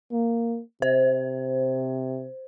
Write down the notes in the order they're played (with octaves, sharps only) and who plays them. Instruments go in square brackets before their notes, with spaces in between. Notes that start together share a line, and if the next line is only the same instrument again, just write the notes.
[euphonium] A#3
[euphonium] C3 [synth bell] C5